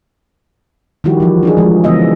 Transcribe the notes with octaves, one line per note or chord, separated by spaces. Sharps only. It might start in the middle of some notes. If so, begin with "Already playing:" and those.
D#3 F3 G3 E4 F#4 G4
E3 F3
D4 D#4 G#4
F3 G#3
C#3 E3 G#3 B3 D#5 E5